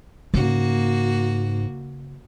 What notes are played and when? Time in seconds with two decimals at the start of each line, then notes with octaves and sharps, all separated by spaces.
0.34 G#2 C#3 A#3 F#4